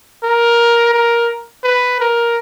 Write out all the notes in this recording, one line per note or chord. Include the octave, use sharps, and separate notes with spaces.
A#4
A#4
B4
A#4